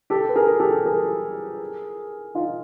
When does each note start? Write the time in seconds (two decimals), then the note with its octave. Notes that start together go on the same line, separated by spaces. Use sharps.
0.10 G4 A4
0.29 B4
0.36 G#4 A#4
0.60 G4 A4
0.85 G#4 A#4
2.35 D#4 F4